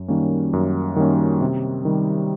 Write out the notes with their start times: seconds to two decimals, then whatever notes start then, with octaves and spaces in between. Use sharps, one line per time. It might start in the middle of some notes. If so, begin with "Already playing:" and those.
Already playing: F#2
0.08 D#3 G3 A#3 C#4
0.53 F#2
0.96 D#3 G3 A#3 C#4
1.41 C3
1.85 D#3 G3